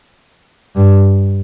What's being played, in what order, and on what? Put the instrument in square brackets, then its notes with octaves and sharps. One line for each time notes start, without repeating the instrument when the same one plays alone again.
[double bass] G2